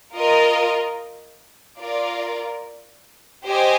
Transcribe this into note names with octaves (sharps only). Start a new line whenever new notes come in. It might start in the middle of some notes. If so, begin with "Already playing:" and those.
F4 A#4 D#5
F4 A#4 D5
G4 C5 D#5 G#5